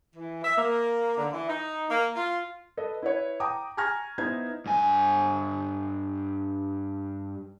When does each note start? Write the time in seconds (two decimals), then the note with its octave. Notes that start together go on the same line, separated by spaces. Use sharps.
0.16 E3
0.45 E5
0.58 A#3
1.18 D3
1.33 E3
1.49 D#4
1.90 A#3
2.16 F4
2.77 A4 B4 D#5
3.02 E4 B4 C#5
3.40 G5 A#5 D6 D#6
3.77 G#5 A#5 C#6 F6 G#6 A#6
4.18 B3 D#4 E4 C5 G#6
4.66 G2 G#5